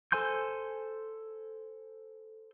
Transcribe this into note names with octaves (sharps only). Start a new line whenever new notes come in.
A4 C5 G#5 C6 G6